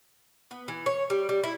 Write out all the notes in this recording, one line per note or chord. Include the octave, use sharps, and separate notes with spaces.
B3
E3
C#5
G3
G3
E4